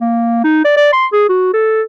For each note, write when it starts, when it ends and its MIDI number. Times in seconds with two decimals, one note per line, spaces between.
0.01 0.44 58
0.44 0.64 63
0.65 0.74 74
0.77 0.90 74
0.93 1.06 84
1.13 1.24 68
1.29 1.53 66
1.54 1.82 69